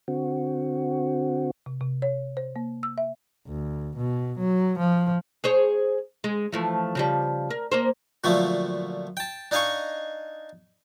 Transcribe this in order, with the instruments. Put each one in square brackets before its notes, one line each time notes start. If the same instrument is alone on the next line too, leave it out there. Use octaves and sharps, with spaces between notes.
[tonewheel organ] D3 C4 F#4
[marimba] C3
C3
C#5
C5
A#3
E6
E5
[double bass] D2
B2
F#3
F3
[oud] G#4 C5 C#5
G#3
E3 F3 A3
C#3 F3 G3
A#4
A#3 A#4 C5
[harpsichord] A#2 D3 F3 F#3 A3
G5 A5
D4 D#4 D#5 F5 G#5 C#6